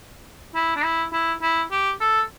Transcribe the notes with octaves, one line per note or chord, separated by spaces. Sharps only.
E4
D4
E4
E4
E4
G4
A4